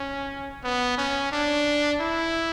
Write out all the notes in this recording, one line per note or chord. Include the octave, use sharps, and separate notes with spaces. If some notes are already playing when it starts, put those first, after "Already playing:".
Already playing: C#4
B3
C#4
D4
E4